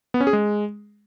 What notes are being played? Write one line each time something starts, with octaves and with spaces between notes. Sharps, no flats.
B3
C#4
G#4
G#3